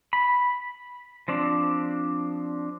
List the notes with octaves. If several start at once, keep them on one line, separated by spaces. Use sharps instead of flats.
B5
F3 C4 D4